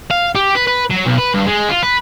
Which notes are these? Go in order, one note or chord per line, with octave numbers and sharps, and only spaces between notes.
F5
G4
B4
B4
F#3
B1
B4
G2
G#3
F4
B4